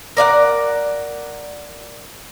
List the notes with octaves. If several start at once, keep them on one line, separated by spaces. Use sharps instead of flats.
A#4 D5 F5 F#5